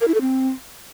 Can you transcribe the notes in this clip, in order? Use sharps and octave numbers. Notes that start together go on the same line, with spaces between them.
A#4
E4
A4
C4